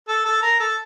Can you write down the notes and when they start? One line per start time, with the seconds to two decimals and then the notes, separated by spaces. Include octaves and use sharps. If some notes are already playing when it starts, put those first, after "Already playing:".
0.08 A4
0.26 A4
0.42 A#4
0.60 A4